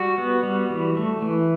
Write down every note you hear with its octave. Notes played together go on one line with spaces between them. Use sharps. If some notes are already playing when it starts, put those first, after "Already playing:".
Already playing: G3 F#4
B3
G3
E3
A3
E3